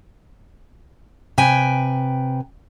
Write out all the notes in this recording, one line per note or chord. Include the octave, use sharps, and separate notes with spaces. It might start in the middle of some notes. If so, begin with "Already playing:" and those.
C3 B4 G5 G#5